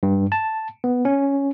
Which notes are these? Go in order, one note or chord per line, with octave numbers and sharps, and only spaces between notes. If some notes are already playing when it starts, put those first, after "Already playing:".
G2
A5
B3
C#4